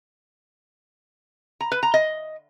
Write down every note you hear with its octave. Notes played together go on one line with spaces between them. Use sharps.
A#5
B4
A#5
D#5